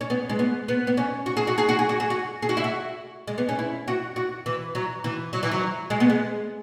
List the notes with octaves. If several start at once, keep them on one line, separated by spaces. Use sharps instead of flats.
C#4
B3
G#3
B3
B3
B3
C#4
F#4
G#4
F#4
G#4
F#4
G#4
F#4
G#4
F#4
G#4
F#4
E4
F#4
G#3
B3
C#4
E4
F#4
F#4
E3
F#3
E3
F#3
E3
F#3
G#3
B3
G#3